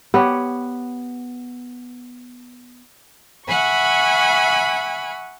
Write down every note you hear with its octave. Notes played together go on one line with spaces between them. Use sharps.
B3 G4 C#5
E5 F#5 G#5 B5 C#6